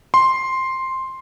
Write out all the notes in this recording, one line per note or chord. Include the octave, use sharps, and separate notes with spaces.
C6